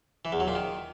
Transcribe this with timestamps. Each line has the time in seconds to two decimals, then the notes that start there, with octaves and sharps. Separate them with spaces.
0.25 E3
0.32 E2
0.40 F#3
0.48 A#2
0.55 D#3